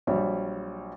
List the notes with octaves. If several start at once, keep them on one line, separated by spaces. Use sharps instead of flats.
A#1 F#3 G3 C#5